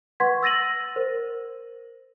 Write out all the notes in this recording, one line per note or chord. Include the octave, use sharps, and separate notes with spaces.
B4 F#5 C6 C#6 G#6 B6
E6 A6 A#6 D#7 F#7
A#4 C5